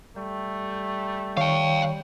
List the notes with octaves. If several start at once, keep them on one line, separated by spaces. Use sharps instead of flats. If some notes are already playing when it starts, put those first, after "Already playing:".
G3 A3
D#3 C#5 F5 G5 C#6